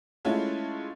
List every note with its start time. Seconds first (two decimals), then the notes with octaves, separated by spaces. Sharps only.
0.25 G#3 A3 C#4 E4 F4